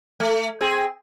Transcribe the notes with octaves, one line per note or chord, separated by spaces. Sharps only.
A3
C4 G#4